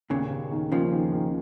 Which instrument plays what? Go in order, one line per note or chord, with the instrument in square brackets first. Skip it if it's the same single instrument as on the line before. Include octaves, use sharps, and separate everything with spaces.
[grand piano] D#2 [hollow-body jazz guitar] A#2 C#3
[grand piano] D#2
D#3
[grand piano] D#2 [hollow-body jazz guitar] C#3 F3
[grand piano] D#3
D#3